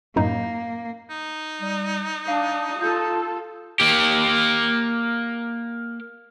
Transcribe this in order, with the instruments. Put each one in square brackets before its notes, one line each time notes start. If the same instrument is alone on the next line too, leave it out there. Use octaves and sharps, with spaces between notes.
[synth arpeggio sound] F#2 A2 D#4 [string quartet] A#3
[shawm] D#4
[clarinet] G3
[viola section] D4 [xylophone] F5 [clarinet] D#6
[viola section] F4 A4 [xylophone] F5 G6
[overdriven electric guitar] A#3 G4